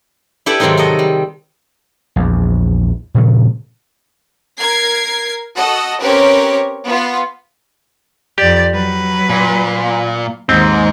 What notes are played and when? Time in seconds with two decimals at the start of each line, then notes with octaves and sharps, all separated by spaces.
0.46 E4 G4 A4 B4 D5
0.60 G#2 C3 D#3 F#3 C4 D#4
0.77 F#4 A4 D#5
0.99 G3
2.16 A#1 E2
3.15 A#2 C#3 F3 A3
4.59 A#4 G#6 C7
5.57 F#4 A4 D#5 F#5
6.01 C4 C#4 G4 A#4 B4 C#5
6.86 B3 F4
8.38 F2 G4 D5
8.72 F#3 B4
9.30 A#2
10.49 D#2 G#2 C4